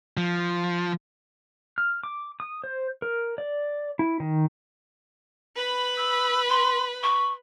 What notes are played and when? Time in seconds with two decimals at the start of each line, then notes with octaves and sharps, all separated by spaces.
0.17 F3
1.78 F6
2.03 D6
2.40 D#6
2.64 C5
3.02 A#4
3.38 D5
3.99 E4
4.20 D#3
5.56 B4 B5
5.97 E6
6.49 C6
7.03 C#6